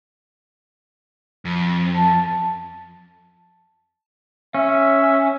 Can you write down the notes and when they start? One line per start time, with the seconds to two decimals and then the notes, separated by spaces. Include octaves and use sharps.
1.45 F2
1.96 A5
4.54 C#4 E5